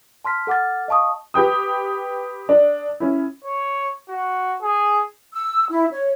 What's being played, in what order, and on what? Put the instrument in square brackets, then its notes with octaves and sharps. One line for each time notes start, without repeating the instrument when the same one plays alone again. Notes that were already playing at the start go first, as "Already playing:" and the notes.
[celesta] A5 C6 F6 B6
A4 F#5 D6 F6 A6
D#5 F5 A5 C#6 D#6
[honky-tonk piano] G4 B4 G5 D#6
D4
C#4 E4
[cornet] C#5
F#4
G#4
[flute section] E6
E4
C#5